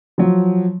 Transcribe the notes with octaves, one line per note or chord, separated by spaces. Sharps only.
F3 F#3